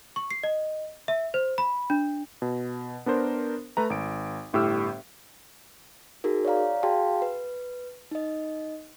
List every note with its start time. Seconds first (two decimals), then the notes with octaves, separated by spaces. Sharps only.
0.16 C#6
0.31 C7
0.43 D#5
1.08 E5
1.34 C5
1.58 B5
1.90 D4
2.42 B2
3.06 B3 D4 A#4 C5
3.77 A3 B4 A#5
3.90 G#1 D7
4.53 G1 A2 G4 E6 F6
6.24 D#4 F#4 G#4 A#4
6.45 C#5 D5 F5 A#5
6.83 F#4 G#4 F5 G5 A5 C6
7.22 B4
8.11 D#4 D#5